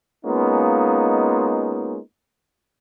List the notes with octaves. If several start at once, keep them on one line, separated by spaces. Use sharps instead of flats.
G#3 A#3 B3 C#4 D#4 F4